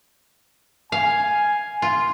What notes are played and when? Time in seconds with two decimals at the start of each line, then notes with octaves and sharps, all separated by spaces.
0.92 F5 G#5
1.82 F4